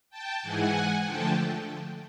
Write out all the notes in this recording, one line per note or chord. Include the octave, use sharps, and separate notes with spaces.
G5 A5
G#2 E3 G#3 F#5 G#5
D3 F3 A3 G5 A5